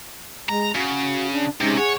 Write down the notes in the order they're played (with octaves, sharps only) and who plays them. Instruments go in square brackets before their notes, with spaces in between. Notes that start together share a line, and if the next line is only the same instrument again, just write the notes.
[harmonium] G#3 [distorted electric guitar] A#5
[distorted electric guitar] C#3 [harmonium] F#4
[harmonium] D4
[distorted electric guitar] C3 [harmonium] G#3 C#4 D#4
[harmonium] G#4 F#5 [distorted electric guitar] C#5